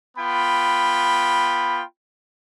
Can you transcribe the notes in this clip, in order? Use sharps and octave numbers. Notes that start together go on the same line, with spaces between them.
B3 F4 G5 B5